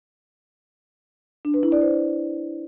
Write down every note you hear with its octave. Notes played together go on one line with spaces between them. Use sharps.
D4
B4
E4
D5
C5